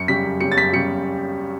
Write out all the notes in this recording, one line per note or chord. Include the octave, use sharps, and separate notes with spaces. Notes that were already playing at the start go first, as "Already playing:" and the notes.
Already playing: F#2 C#7
C#3 G3 B6
F#2
C#3 G3 C#7
A6
F#2 B6
C#3 G3 C#7